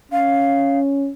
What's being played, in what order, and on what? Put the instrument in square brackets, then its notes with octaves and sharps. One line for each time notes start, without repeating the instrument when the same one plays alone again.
[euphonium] C#4 [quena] F5